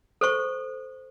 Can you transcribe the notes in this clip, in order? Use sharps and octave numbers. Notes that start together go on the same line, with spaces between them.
A4 C5 C#6